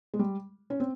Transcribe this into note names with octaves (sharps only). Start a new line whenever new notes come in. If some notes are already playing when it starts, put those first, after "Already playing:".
G#3
G3
C#4
C4